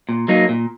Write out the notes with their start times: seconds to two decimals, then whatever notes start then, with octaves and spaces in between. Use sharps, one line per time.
0.09 A#2
0.28 F#3 A#3 D#4
0.49 A#2